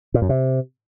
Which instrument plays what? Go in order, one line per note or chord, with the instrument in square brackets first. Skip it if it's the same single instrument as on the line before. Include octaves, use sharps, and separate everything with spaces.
[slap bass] A#2
F#2
C3